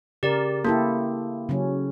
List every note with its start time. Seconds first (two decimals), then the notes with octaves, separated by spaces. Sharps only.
0.23 C#3 G4 A#4 D5
0.65 A#3 E4 G4 A4
1.49 C#3 F#3 C#4